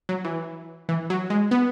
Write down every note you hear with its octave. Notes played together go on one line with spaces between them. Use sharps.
F#3
E3
E3
F#3
G#3
B3